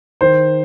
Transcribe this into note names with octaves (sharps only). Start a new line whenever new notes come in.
D#3 C5